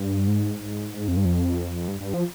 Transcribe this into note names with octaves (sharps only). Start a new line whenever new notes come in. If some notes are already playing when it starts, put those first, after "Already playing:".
Already playing: G2
G#2
F2
G2
F2
G2
G2
F3